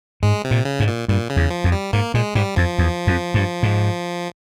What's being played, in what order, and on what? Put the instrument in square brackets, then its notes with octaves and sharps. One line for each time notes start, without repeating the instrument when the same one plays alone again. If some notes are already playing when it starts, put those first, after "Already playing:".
[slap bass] G#2 [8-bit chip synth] G#3
[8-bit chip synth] C3
[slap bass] A#2
[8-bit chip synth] C#3
[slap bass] G#2
[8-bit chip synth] A#2
[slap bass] G2 [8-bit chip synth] A#2
[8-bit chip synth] C#3
[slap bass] E2
[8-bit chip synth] F3
[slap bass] F2
[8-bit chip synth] G3
[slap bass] G#2 [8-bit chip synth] A#3
[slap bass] A#2 [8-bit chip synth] G#3
[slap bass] G#2 [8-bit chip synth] G3
[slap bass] F2 [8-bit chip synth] F3
[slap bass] E2
F2
G2
G#2